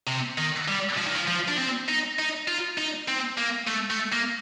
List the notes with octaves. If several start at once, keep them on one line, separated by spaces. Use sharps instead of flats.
C3
D#3
G3
F3
D#3
F3
F3
D4
C4
D#4
D#4
F4
D#4
C4
A#3
A3
A3
A#3